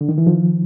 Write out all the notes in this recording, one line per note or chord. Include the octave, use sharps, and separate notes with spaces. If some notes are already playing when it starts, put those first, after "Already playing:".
D3
D#3
E3
D#3 F3